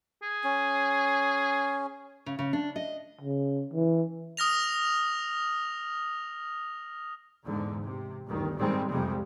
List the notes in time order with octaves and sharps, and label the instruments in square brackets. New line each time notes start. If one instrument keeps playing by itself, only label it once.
[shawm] G#4
[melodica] C#4
[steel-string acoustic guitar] C#3
C#3
D4
D#5
[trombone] C#3
E3
[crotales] D#6 F6 A#6 F7
[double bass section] E2 G#2 D3
C3
G1 D2 D#3
G#2 D#3 G3 G#3 C4
C2 F2 C3 G3 G#3